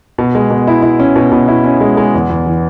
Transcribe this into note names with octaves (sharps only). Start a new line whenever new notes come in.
B2
G#3
B2
E4
E4
C#4
B2
B2
E4
C#4
G#3
G#3
E2
E2
E3